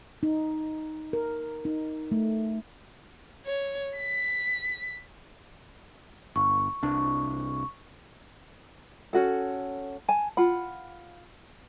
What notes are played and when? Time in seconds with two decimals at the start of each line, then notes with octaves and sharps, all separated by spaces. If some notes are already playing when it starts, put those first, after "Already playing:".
0.23 D#4
1.13 A#4
1.65 D#4
2.12 A3
3.45 C#5
3.97 B6
6.36 G1 C#6
6.83 C2 D4
9.13 C#4 F#4 A4
10.08 G#5 A5
10.37 F4 F#5 B5